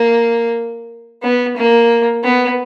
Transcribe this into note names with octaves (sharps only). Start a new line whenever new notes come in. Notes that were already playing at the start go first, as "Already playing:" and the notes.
Already playing: A#3
B3
A#3
B3